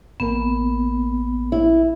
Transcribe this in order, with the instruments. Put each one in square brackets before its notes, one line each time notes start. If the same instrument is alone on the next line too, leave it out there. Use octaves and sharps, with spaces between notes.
[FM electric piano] A1 A#3 A#4 [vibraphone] B3
[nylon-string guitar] E4